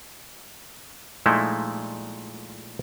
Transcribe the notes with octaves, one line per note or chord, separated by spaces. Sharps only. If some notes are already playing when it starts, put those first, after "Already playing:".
A#2 F3 G#3 A3 D#4 E4